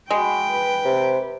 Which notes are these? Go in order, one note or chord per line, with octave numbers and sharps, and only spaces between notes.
G#3 F#4 G5 B5
B4
C3